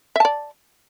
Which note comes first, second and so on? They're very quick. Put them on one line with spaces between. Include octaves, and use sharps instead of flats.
E5 A5 D5